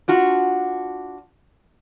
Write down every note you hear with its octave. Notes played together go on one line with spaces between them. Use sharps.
D4 F4 F#4